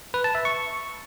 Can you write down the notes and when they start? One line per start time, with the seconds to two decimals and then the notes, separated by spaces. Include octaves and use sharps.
0.14 B4
0.24 A5
0.35 E5
0.45 C#6